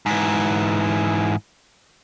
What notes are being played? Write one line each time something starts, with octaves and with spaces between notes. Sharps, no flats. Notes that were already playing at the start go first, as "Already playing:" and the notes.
G#2 E3